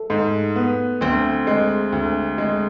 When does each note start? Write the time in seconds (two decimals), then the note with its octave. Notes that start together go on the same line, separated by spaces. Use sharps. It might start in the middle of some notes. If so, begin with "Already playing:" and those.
Already playing: A3
0.10 G#2
0.56 B3
1.01 D2 C4
1.47 G#3
1.93 D2
2.38 G#3